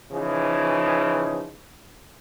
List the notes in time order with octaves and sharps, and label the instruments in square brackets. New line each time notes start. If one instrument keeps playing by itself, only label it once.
[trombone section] C#3 E3 F3 D#4